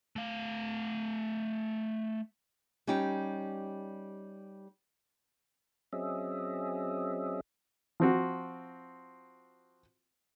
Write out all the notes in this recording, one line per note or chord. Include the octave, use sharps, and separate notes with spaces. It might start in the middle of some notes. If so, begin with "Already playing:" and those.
A3 F5
G3 C#4 D#4 G4
F#3 C4 C#4 G#4 D#5 E5
F3 C4 F#4